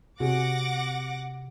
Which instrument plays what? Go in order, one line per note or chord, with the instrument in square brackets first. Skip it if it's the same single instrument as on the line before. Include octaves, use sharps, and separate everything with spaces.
[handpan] C3 [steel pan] F#4 G#4 [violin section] F#5 D6 A#6